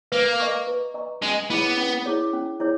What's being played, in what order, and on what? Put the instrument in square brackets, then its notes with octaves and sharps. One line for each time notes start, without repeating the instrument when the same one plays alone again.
[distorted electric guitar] A#3 [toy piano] B4
[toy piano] D#5 A#5 C#6
B4
D#5 A#5 C#6
[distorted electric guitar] G#3 [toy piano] C#4
[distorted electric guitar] B3 [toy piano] E4 G#4 C#5
[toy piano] C#4
E4 G#4 C#5
C#4
E4 G#4 C#5